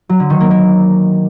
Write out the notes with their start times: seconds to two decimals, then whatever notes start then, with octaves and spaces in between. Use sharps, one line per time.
0.09 F#3
0.20 D3
0.30 D#3
0.40 A#3
0.51 A#3